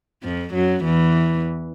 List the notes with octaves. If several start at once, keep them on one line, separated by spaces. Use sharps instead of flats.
F2 F3
F#2 F#3
E2 E3